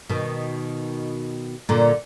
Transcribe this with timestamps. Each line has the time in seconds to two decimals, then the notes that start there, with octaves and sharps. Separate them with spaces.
0.09 B2 D#3
1.69 A#2 D3